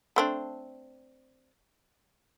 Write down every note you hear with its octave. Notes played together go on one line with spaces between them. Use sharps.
A3 C4 D4